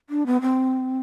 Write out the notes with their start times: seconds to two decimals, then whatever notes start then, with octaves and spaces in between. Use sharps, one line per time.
0.10 D4
0.26 B3
0.41 C4